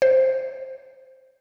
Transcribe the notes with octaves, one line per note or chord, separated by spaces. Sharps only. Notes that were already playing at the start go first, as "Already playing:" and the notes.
C5